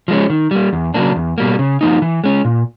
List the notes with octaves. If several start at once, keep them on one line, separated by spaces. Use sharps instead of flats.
F3 G#3 C#4
D#3
G3 A#3
E2
C#3 F#3 A#3 D4
E2
B2 G3 A#3
C#3
F3 A#3 D#4
E3
G#3 C#4
A#2